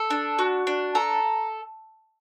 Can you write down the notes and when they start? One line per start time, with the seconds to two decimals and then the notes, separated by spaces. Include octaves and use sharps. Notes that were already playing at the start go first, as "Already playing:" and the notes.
Already playing: A4
0.10 D4
0.39 F#4
0.67 D4
0.95 A4 A#5